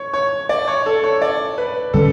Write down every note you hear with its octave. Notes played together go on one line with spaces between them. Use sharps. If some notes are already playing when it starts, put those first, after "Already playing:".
Already playing: C#5
C#5
D5
C#5
A4
C#5
D5
B4
D3 G3 C#4 A4